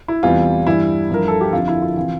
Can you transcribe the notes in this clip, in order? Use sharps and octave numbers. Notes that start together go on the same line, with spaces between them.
E4
E2 C3 E3 G3 F4
G2 E3 G3 E4
G2 F3 A#4
A4
G4
F2 D3 F3 F4
E4
F4
C3 E3 F4